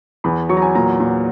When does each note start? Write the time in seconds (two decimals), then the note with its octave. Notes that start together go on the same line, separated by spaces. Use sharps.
0.24 E2 B5
0.49 F#3 C#6
0.57 A#5
0.62 G#5
0.75 A#2 A#5
1.00 A#2